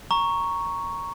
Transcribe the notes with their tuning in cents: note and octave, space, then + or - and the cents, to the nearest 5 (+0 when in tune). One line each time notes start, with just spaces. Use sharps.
A#5 +0 C#6 +0